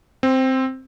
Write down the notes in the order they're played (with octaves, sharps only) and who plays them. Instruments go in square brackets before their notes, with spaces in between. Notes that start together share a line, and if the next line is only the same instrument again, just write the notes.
[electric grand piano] C4